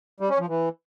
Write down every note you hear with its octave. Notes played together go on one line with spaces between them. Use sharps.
G3
C#4
F3
E3